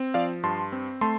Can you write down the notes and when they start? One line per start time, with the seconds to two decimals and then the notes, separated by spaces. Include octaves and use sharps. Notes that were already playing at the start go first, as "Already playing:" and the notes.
Already playing: C4
0.14 F3 D5 F5
0.43 G2 A5 C6
0.72 C4
1.01 A3 A5 C6